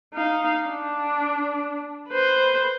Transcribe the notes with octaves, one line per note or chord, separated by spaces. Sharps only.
D#4 F5
D4
B4 C5